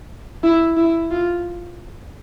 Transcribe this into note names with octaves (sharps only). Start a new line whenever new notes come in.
E4
E4
F4